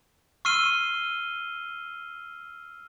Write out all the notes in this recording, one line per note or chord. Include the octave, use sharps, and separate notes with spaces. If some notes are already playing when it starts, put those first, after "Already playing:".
C#6 E6 F6 C7 D#7 G7